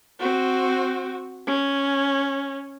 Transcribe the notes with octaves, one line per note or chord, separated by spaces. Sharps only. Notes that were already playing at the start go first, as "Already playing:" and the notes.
C4 F#4
C#4